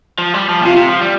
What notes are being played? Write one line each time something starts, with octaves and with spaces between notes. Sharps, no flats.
F3
G3
F3
A#2
C3 F4
C3
F3
G3